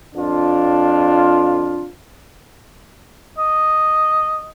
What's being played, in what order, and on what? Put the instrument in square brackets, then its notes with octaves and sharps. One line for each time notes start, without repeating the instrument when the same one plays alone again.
[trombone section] F2 D4 F4
[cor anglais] D#5